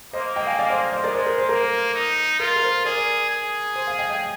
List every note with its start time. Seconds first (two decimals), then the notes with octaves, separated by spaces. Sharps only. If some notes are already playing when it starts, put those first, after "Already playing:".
0.13 A#3 C5 D#5
0.36 D#5 G5
0.47 F5 G#5
0.59 D5 F5
0.70 C5 D#5
0.92 C5 D#5
1.04 G#3 A#4 D5
1.15 C5
1.27 A#4
1.38 C5
1.49 A#3 A#4
1.94 D#4
2.40 F4 A#4
2.56 A#4
2.63 C5
2.85 G#4 A#4 D5
3.30 G#4
3.76 C5
3.87 F5 G#5
3.98 D#5 G5
4.09 D#5 G5